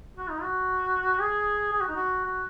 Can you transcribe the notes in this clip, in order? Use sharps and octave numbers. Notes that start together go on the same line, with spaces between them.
F#4
D#4
F#4
G#4
G#4
F#4
D#4
F#4
F#4